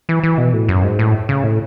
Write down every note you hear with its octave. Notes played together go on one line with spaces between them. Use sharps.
E3
E3
B2
A2
F#2
G#2
A2
C#3
A2